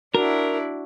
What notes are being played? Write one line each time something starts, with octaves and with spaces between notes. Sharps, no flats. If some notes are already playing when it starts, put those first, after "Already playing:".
D4 E4 F#4 A#4